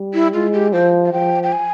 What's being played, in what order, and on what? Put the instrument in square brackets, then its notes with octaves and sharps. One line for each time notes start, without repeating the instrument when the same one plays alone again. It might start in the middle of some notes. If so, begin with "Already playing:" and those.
Already playing: [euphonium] G3
[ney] E4
[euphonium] G#3 [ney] F4
[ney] G4
[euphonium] F3 [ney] C5
[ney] F5
[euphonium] F3 [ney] G5
[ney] G5
G#5